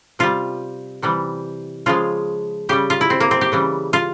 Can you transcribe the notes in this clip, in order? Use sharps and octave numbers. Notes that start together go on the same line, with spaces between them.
C3 G3 F4
C3 E3 G3
C#3 F3 G#3 F4
C#3 G3 G4
F4
E4
C4
A#3
C4
G4
C#3 E3 G3
F4